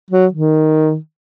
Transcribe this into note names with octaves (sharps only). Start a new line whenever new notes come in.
F#3
D#3